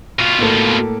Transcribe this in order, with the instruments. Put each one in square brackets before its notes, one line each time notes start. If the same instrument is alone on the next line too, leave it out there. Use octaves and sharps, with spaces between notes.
[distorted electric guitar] B2 F4
[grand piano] A2 A#3 A4